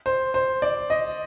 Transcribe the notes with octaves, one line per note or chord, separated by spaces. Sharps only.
C5
C5
D5
D#5